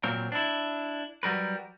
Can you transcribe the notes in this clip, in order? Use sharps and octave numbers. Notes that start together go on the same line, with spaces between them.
A#2 F#3 C4 A#4
D4 E4
F#3 G3 A#4 B4